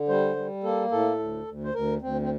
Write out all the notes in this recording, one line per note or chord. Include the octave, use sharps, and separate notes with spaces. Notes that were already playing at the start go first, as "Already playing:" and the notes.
Already playing: D3
G3 C5
G3
A#3 A4
A2 A4
D2
D2
C5
D2 A#4
D2 C4
C4